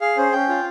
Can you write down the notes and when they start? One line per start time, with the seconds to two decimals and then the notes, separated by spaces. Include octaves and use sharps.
0.01 G#4 F5
0.17 C#4 C5
0.33 C#4 G5
0.49 F4